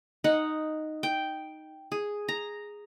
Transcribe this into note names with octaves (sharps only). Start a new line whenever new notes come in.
D#4 F#5
G5
G#4
A#5